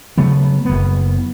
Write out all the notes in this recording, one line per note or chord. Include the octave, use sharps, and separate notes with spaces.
C#3 F#3 A3 B3
F#1 B3